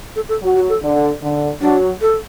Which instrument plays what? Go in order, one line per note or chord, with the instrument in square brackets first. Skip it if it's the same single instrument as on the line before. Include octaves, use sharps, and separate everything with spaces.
[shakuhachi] A4
A4
[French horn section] F#3
[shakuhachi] F#4
A4
[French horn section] D3
D3
[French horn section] F#3 [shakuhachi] D4
[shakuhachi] A4